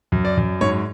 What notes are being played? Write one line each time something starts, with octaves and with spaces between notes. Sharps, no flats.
F#2
D5
F#2
G#2 C#5